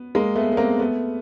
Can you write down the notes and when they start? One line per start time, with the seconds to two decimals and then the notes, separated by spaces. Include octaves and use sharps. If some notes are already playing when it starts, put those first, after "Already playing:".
Already playing: B3
0.15 G#3 A#3
0.35 A3 B3
0.52 B3
0.57 A#3 C4
0.79 A3 B3